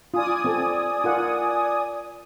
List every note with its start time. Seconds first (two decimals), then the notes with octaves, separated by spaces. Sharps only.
0.14 F4 D5 G#5 D#6
0.45 C4 A4
1.04 F4 A#4 F#5